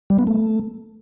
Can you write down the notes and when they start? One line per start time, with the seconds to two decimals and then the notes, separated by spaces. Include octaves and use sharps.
0.10 G3
0.19 B3
0.27 A3